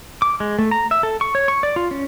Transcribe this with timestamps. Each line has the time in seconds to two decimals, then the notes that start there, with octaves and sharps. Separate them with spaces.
0.22 D6
0.40 G#3
0.59 A3
0.71 A#5
0.91 E5
1.03 A4
1.21 C#6
1.35 C#5
1.48 C#6
1.63 D5
1.76 F4
1.91 C#4